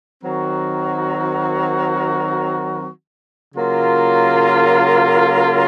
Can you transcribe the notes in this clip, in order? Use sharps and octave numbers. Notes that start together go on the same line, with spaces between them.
D#3 F#3 C4 F#4 A#4
C#3 F#3 A#3 F4 A#4